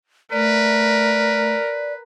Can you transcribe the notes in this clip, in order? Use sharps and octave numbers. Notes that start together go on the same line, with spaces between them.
A3 A#4 B4 D5